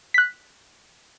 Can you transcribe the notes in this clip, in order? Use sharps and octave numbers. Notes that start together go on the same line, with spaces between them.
F#6 B6